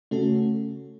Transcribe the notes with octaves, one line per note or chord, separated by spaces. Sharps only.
C#3 A3 C#4 F#4 A4